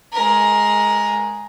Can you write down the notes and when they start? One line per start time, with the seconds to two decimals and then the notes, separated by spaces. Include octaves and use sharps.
0.13 G#3 A#4